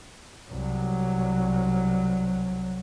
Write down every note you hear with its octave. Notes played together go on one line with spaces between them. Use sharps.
C2 F#3